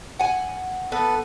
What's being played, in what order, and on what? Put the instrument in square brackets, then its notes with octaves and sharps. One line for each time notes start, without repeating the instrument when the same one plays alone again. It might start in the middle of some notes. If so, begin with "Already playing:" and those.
[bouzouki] F#5 G#5
[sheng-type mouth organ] B3 A4 [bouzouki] B4